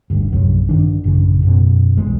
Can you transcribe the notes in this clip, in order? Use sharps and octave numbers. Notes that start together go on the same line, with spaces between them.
E1 D2 G2
A#1 F#2 C3 F#3
G2 D#3 D4
A1 F#2 C#3
F#2 B2
D#1 B1 E2 G#3